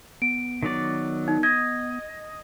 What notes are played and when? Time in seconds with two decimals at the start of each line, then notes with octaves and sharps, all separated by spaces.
0.22 B3 D7
0.63 D#3 F#3 D5
1.28 D#4
1.43 D#5 G#6